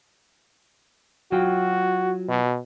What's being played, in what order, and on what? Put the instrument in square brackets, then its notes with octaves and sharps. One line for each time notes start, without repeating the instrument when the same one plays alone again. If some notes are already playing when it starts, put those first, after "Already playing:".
[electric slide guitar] F#3 F4 G5 [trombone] F#4
[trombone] B2